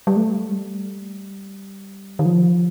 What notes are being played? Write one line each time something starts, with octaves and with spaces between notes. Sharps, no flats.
G3
A3
G3
D#3
F3